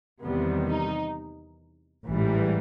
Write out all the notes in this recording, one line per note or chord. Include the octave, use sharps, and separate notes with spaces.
E2 C3 D#3 G3 B3
D#4
A1 G#2 E3 G3